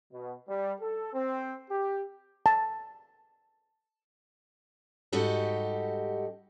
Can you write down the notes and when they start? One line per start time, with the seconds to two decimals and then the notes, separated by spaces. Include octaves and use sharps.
0.12 B2
0.47 G3
0.80 A4
1.14 C4
1.70 G4
2.46 A5
5.12 G#2 G3 D#4 F#4 G4 A4